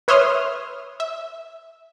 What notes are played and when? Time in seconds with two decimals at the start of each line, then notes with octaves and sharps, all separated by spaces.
0.08 B4 C#5 E5 C6 D#6 F6
1.00 E5